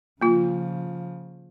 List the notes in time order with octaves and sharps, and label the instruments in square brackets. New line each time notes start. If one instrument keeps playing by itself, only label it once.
[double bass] C#3 F3 [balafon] A#3 F4